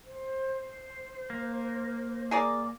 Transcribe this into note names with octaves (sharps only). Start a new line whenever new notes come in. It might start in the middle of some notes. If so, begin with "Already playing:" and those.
C5
A#3
G#4 A#4 D5